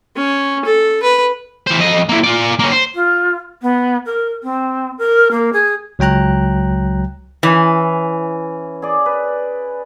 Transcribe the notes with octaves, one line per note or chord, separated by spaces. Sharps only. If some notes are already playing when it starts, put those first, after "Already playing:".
C#4
A4
B4
E3 C5
F2 D#5
A#3 E4
F4 D5
A#3 C#4
C5
F4
B3
A#4
C4
A#4
A#3
G#4
C#2 F#3 G5 A#5 F#6
E3 C#4
G#4 D5
B4